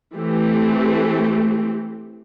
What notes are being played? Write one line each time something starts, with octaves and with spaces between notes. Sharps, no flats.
E3 A3 C4 G4